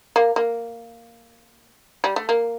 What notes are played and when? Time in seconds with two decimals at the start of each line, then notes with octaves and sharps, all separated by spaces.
0.16 A#3
0.36 A#3
2.04 G3
2.16 A3
2.29 A#3